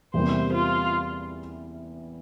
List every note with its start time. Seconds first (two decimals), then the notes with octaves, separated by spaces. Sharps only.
0.14 E2 C3 G3 A#3 E4 C5
0.53 F4